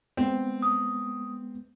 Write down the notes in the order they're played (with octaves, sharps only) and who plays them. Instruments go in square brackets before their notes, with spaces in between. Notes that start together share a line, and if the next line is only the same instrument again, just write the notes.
[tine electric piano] G#3 B3 [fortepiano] C4
[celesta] D#6